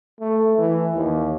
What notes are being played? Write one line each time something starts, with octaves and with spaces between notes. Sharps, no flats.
A3
E3
D#2